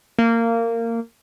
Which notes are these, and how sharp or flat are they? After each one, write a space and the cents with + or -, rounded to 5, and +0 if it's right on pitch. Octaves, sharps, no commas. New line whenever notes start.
A#3 -20